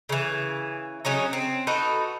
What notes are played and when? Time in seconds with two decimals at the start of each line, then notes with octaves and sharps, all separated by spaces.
0.09 C#3 E3
1.05 C#3 F#3 C#4 D#4
1.33 C4
1.67 D#4 F#4 A4 B4